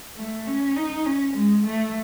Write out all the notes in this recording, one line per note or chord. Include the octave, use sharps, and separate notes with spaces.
A3
C#4
D#4
C#4
G#3
A3